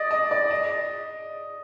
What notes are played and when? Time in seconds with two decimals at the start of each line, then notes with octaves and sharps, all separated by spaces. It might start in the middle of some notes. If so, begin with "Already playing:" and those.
Already playing: D5 D#5
0.11 D#5
0.31 D5
0.51 D#5